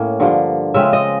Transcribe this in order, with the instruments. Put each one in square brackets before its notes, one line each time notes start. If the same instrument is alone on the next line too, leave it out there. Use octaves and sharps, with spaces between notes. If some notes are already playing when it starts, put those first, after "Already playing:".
Already playing: [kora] A2 A#3 C#4
G2 D3 F3
C#3 F3 G#3 C4 E5
D#5